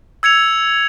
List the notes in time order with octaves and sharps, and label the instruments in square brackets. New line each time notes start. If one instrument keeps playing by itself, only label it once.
[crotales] E6 G#6 C#7 F7